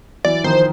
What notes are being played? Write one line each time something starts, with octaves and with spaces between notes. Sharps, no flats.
E3 F#3 D5
D#3 F3 C5